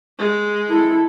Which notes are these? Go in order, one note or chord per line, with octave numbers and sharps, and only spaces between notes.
G#3
E4 A4